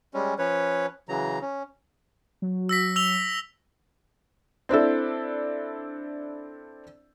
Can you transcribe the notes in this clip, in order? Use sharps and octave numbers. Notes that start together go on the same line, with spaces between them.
G3 G#3 C#4
F3 C#4 B4 C#5
C#3 E3 F#3 A#5
C#4
F#3
E6 A#6 B6
E6 F7 G7
C4 D4 E4 A4